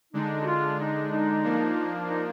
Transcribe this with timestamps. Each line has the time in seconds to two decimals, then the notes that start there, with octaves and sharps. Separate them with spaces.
0.13 D3 G#3 D4 D#4
0.42 F#4
0.46 F4
0.79 D#4
1.11 D#4
1.43 F3 A#3 D4
2.07 D#4